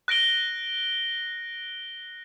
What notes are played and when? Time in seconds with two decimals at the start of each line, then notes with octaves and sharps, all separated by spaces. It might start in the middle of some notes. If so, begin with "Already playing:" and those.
0.08 F#6 A#6 D7 G7